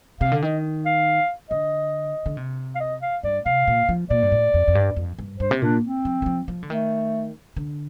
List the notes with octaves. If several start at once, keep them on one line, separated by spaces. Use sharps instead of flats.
C3 F5
D3
D#3 D#5
F5
D3 D#5
D3
C3
F5
D#5
F5
G2 D5
C3 F5
A#2
F3
A#2 D5
G2
A2
F2
F2
G2
F2
G2
G2 C5
C3
A#2 D4
C4
F3
D#3
F3
F3
D3
D#3 A3
D3